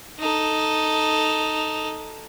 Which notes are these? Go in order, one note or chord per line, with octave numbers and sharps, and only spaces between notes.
D#4 A4